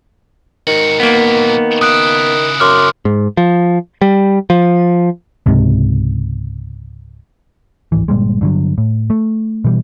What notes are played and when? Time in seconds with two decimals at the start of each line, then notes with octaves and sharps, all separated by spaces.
0.67 G#2 D#3 F#4
1.00 A#2 F#3 A#3 B3
1.81 C#3 E4 D#6 F#6 D7
2.60 F#2 C6 D6 F6
3.05 G#2
3.37 F3
4.02 G3
4.50 F3
5.46 C#2 G#2 C3
7.92 D1 G#1 E3
8.08 G1 A#2 G3 G#3
8.41 G2 D3 F#3
8.78 A2
9.10 A3
9.65 B2 E3 G3